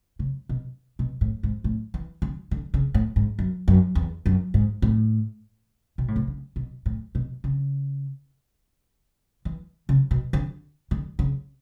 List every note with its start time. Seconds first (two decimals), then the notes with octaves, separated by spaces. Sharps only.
0.19 C#3
0.49 B2
0.99 B2
1.21 A2
1.43 G#2
1.64 A2
1.94 E3
2.22 D3
2.51 D3
2.74 C#3
2.94 A2
3.16 G#2
3.39 F#2
3.68 F#2
3.95 E2
4.26 F#2
4.54 G#2
4.82 A2
5.98 B2
6.08 A2
6.16 B2
6.27 C#3
6.56 B2
6.86 A2
7.15 B2
7.44 C#3
9.45 E3
9.89 C#3
10.11 B2
10.33 D3
10.91 D3
11.19 C#3